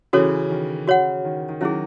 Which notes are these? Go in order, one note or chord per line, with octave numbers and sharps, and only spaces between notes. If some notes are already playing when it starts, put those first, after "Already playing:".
C#3 E3 C#4 F#4 A4 C#5
D#3
C#3 F#4 C#5 F#5
D#3
D#3
D#3 F#3 C#4 E4 G#4